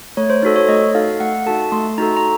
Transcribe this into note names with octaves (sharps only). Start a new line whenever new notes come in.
A3 C#5
C5
D#4 F#4 A4
C#5
A3 D#5
D#4 F#4 A4 F5
A3 F#5
D#4 F#4 A4 A5
A3 C6
D#4 F#4 A4 A#5
A#5